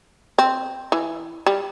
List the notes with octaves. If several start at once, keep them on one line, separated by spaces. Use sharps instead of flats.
C4
E3
G3